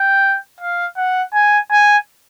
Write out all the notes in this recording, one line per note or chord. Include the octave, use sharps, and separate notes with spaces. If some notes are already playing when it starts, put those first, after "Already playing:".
Already playing: G5
F5
F#5
G#5
G#5